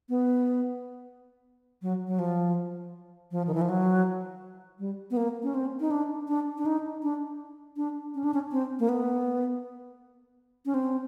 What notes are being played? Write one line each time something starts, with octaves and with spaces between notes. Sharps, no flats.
B3
F#3
F#3
F3
F3
D#3
E3
F3
F#3
G3
B3
A#3
C#4
C4
D#4
D4
D4
D4
D#4
D4
D4
C#4
D4
C#4
C4
A#3
B3
C#4
C4